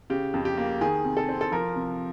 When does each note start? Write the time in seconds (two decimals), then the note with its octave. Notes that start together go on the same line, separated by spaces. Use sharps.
0.10 C#3 G4
0.34 F2
0.45 G4
0.57 A#3
0.81 D#3 G#4
1.05 C3
1.17 A4
1.29 C4
1.41 A4
1.52 F3 A#4
1.76 C3